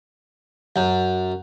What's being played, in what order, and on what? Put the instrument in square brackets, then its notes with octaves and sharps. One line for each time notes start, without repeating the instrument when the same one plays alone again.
[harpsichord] F#2